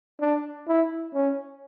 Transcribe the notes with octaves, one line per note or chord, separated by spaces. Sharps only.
D4
E4
C#4